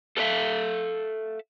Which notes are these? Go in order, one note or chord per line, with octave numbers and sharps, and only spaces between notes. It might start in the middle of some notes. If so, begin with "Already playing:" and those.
A4 A#4 D5 E5 F5